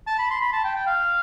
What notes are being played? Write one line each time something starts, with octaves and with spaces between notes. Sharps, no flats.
A5
B5
C6
B5
A5
G5
G5
F5